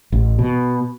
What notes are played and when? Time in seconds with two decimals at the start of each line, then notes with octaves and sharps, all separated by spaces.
0.12 A1
0.39 B2